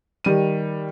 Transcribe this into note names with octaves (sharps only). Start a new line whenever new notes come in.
D#3 G3 D#7